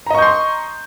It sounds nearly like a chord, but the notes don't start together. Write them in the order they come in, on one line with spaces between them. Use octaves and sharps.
A#5 D#5 C#6 G6 C6